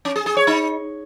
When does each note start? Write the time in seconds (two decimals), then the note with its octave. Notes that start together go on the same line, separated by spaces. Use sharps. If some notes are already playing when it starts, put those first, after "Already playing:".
0.05 C#4
0.16 G#4
0.26 G#4
0.37 C#5
0.47 D#4